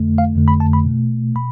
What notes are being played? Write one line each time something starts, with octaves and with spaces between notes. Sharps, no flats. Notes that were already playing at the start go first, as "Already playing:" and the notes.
Already playing: F2 D3 A3
F5
F2 D3 A3
B5
A5
B5
B2 A3
B2 B5